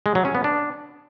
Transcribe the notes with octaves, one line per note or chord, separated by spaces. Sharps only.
G#3
F#3
C#4
B3
D4